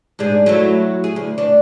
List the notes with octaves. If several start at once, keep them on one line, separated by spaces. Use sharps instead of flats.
G#2 D4 G#4
F#3 A3 E4
G#4
D2
D4